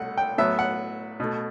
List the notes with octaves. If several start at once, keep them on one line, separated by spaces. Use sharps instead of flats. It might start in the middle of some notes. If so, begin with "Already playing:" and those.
Already playing: C2 B2 A3 F#5
G5
A2 F#3 B3 E5
F#5
B2 A3